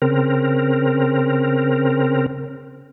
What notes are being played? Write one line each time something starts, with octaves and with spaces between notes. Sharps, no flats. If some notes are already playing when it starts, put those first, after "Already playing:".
C#3 C4 A#4